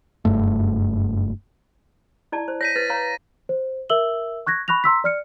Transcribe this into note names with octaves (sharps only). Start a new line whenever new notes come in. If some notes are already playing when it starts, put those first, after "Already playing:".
F#1 G2 A3
E4 D5 A5
C5
C#5 A#6 B6 D#7
B4 A6
C#5 F5 A#5
C5
A#4 E5 E6 F#7 G7
C#6 F#6 G#6 A#6
B5 C#6 F#6 A#6 F7
A#5 C6 E6 B6
D5 F6 C#7